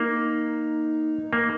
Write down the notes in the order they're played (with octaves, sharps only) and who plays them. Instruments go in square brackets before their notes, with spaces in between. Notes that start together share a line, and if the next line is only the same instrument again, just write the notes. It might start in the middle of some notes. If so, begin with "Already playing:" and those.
Already playing: [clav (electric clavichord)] A#3 [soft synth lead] D#4
[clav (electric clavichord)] A#3